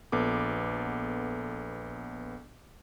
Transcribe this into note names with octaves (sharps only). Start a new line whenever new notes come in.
A#1 B3 A4 D6